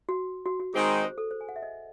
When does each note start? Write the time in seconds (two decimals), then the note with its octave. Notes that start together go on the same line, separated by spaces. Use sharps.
0.09 F#4
0.46 F#4
0.60 F#4
0.74 D#3 G#3 C4 D#4 G#4
1.04 C5
1.18 A4
1.31 C5
1.41 G#5
1.49 F#5
1.56 E5
1.62 D#5